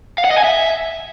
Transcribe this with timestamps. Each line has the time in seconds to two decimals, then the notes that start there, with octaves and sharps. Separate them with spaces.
0.18 F5
0.25 F#5
0.31 D#5
0.37 G#5
0.44 E5